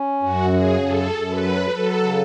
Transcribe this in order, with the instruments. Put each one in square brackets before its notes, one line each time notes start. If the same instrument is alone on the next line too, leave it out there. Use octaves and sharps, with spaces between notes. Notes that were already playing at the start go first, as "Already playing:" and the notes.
Already playing: [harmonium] C#4
[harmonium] F#2 [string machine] F#4
[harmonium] C#3 [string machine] G#4
[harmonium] F#2 [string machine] A4
[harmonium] F#2
[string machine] B4
[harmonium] F#3
[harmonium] F#3 [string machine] A4
[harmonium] C#3